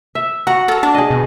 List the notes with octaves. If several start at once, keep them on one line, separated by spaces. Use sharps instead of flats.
E5
F#4 F#5 A#5
A4 A#4 A#5
D4 A5
G#4 D#5
B2